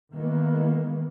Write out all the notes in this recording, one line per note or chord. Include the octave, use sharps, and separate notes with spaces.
D#3 E3 G#3 A#3 B3